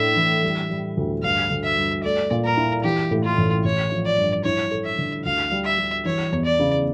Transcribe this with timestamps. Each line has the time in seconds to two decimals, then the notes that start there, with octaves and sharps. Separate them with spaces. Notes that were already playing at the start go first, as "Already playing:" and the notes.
Already playing: A2 D4 E5
0.16 E3
0.43 G3
0.70 G3
0.97 D2
1.23 G2 F5
1.51 D3
1.64 E5
1.78 G2
2.04 A3 D5
2.31 A#2
2.45 A#4
2.57 E4
2.84 E3 G4
3.11 A2
3.24 F4
3.38 A1
3.64 A1 C#5
3.92 F3
4.05 D5
4.18 G2
4.45 E4 C#5
4.71 A4
4.85 E5
4.98 D3
5.25 D2 F5
5.51 G3
5.65 E5
5.78 G3
6.05 E3 C#5
6.32 E2
6.45 D5
6.59 C#3